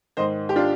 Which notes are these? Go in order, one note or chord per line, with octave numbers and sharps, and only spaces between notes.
G#2 D#3 C5 D#5
G4
D4 F4